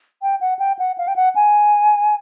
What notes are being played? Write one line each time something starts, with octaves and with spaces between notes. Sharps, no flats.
G5
F#5
G5
F#5
F5
G5
F#5
G#5